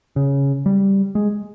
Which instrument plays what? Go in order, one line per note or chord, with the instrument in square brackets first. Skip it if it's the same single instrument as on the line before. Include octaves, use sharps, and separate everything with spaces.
[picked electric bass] C#3
G3
G#3